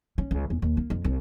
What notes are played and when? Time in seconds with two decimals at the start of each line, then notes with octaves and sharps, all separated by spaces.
0.18 C#4
0.31 C#2
0.50 E2
0.62 D#2
0.77 A#3
0.90 F2
1.04 C2